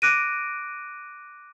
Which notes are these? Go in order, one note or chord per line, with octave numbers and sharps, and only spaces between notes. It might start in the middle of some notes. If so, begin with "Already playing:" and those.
D6 F#6 A#6 D7 D#7